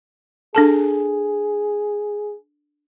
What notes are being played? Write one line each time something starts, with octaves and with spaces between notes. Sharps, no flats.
D4 G#4 A4 A5